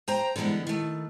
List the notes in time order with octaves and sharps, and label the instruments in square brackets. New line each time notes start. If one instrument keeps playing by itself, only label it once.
[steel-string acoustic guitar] C5 G5 A#5
D3 E3 G3 G#3 B3
D#3 A3